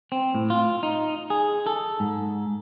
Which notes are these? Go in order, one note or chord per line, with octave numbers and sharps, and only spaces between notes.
C4
A2
F4
D#4
G#4
A4
G#2